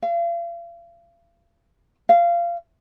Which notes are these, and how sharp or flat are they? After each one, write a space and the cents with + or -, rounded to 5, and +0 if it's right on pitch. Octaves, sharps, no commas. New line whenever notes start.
F5 -40
F5 -20